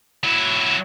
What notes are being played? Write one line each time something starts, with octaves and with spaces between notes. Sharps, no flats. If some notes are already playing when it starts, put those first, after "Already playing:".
F#3 E4